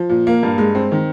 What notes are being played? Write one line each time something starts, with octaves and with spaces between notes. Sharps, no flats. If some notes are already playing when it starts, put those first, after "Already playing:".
Already playing: F3
A#2
A#3
G2
G#3
C4
D#3